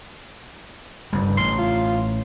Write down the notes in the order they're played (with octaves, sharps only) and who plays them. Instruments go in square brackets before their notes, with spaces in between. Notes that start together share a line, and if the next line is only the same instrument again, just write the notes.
[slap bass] F#1 G2 G3
[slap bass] A1 [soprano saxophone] C6
[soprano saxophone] F4